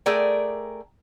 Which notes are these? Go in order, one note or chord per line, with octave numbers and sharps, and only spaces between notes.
A3 G#4 A#4 D5 G5